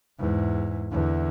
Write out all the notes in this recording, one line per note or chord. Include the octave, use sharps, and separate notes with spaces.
E2 G#2
E2 D3